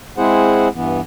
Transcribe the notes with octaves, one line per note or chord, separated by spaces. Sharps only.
G#3 C4 E4 G#4 C5 F#5
G2 E3 B3